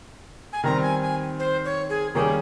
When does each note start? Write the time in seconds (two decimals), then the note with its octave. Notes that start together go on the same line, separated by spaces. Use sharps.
0.53 G#5
0.64 D#3 G3 C4 A#5
0.82 G#5
1.02 G#5
1.39 C5
1.65 C#5
1.89 G#4
2.15 D#3 G3 A#3 C#4 G4 G#4